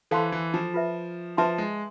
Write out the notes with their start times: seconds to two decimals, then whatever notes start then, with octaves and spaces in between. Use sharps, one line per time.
0.11 E3 A4 C5 F5 A5 C6
0.32 E3
0.54 F3
0.74 F4 B4 E5
1.37 F3 B4 E5 A5 C6
1.58 G#3